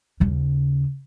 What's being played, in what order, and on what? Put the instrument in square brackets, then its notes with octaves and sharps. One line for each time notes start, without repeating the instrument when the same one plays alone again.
[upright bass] D#2 C#3